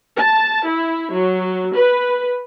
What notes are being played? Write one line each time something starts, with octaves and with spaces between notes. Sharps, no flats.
A5
E4
F#3
B4